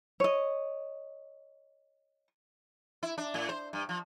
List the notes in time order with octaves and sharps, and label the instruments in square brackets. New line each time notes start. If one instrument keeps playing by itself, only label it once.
[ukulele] C#5 D#5
[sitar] E4
D4
A2
C5
G2
F3